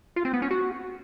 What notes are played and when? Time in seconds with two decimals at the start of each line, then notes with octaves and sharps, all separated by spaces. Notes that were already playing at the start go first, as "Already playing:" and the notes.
0.16 F4
0.25 C4
0.33 B3
0.42 C#4
0.51 F#4